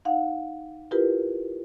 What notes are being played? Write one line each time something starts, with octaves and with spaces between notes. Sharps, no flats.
D#4 F5 F#5
E4 F4 G4 A#4 B4